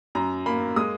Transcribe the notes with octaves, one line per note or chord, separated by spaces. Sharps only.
F#2 A#5
A#3 B5
G#3 D#6